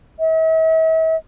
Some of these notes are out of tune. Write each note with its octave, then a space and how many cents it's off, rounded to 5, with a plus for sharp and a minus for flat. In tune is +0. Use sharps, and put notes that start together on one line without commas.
E5 -45